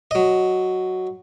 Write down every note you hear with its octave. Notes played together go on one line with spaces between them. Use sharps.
F#3 D#5